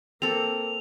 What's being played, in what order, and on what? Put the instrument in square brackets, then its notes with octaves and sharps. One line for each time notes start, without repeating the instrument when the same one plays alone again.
[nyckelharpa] A#3 [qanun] C4 A4 [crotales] F7